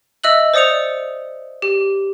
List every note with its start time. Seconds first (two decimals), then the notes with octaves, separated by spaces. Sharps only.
0.24 D#5 E5 E6 F#6 F#7
0.54 C5 D5 D#6 C#7 F7
1.62 G4